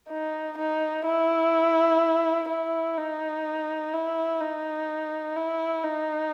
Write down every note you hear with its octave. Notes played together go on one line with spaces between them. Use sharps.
D#4
D#4
E4
E4
D#4
E4
D#4
E4
D#4